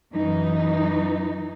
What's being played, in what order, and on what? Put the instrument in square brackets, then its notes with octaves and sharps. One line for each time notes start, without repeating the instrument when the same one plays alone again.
[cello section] F#2 E3 D#4